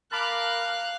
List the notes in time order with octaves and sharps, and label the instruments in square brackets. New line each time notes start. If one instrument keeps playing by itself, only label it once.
[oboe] A#4 [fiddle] F5 F#6 [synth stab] A5 B5 D6